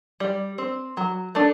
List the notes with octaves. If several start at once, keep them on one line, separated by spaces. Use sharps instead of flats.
G3
C4
F#3
A3 D4